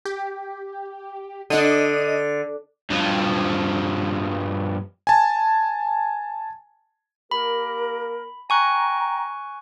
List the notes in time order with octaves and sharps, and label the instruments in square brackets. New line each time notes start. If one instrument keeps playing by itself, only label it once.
[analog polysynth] G4
[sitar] D3 [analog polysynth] D4 D#5 D#7
[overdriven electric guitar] G2 F3
[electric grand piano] G#5 A5
[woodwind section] A#3 G4 A#4 [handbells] B5
[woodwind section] G5 A#5 [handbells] G#5 C#6 F#6